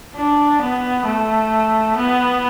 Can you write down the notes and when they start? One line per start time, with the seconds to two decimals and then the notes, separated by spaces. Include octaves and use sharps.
0.15 D4
0.61 B3
1.05 A3
1.96 B3